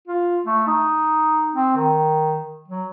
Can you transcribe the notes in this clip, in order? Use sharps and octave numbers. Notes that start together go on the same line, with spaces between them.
F4
A3
D#4
C4
D#3
F#3